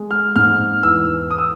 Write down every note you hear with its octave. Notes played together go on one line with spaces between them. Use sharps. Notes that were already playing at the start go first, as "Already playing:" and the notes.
Already playing: G#3
F6
G#2 F6
E2 E6
D#6
E6